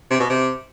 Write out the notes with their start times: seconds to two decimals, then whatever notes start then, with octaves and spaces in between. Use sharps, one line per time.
0.10 C3
0.20 B2
0.30 C3